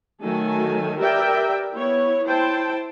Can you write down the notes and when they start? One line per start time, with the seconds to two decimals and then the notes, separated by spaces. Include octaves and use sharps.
0.22 D#3 F#3 A3 A4 G#5
0.99 G4 A#4 B4 D5 E5 G5
1.75 B3 E4 C#5
2.26 E4 C5 G5 A5